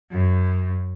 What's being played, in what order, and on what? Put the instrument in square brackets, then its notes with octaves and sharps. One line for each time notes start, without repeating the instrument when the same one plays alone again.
[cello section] F#2